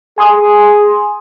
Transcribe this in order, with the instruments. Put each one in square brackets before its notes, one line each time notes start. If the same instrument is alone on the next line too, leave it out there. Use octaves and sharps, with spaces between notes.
[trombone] G#4 [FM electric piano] G#5 C6 D#6